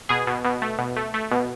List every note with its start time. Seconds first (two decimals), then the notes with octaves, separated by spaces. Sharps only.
0.09 B2 G#4
0.27 B2
0.45 B2
0.62 A3
0.78 B2
0.97 A3
1.14 A3
1.31 B2